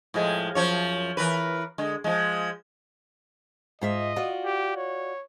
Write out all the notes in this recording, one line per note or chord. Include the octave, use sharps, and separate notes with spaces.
A2 F3 G#3
F#2 F3 C#5
E3 A#4 B4
D3 G#3
F3 G#3
G#2 F4 D#5 E5
F4 F#4 D5
G4
C#5